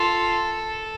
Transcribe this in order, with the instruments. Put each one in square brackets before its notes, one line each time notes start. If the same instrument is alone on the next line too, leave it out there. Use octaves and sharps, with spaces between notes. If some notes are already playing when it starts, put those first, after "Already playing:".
Already playing: [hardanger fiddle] F4 [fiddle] A4